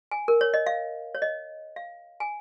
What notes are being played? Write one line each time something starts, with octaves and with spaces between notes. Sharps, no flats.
G#5
A#4
C#5
D#5
F5
C#5
D#5
F5
G#5